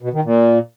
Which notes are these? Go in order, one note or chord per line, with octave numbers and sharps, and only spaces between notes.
B2
D#3
A#2